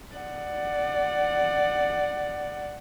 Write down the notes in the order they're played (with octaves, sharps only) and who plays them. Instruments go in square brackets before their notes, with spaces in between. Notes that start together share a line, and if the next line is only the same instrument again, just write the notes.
[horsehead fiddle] D5 F#5